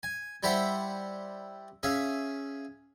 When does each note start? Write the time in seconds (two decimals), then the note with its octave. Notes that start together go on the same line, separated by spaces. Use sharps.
0.03 G#5
0.43 G3 E4 G4 C5 E5 F#5
1.83 C#4 G#4 E5 F5